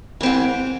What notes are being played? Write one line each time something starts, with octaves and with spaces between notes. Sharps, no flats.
G#2 E3 C4